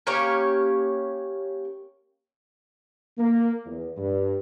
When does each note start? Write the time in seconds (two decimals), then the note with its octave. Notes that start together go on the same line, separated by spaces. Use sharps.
0.07 A#3 C#4 G4 C#5
3.18 A#3
3.66 E2
3.97 G2